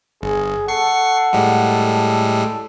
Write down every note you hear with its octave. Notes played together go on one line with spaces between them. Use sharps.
G1 G#4
A4 F#5 C#6 C7
A2 G3 G#3